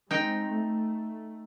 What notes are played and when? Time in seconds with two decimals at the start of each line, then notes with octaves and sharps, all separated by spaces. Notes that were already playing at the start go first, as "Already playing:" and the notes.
0.11 G#3 C4 D#4 G5
0.48 A3